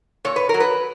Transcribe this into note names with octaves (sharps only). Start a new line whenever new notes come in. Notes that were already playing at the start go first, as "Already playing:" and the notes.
A#2 C#5
B4
A#4
F#3
B4